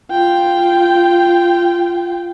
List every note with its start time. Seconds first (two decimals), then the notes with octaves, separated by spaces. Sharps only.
0.11 F4 G5